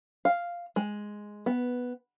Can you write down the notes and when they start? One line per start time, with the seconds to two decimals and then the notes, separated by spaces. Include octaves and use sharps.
0.25 F5
0.76 G#3
1.46 B3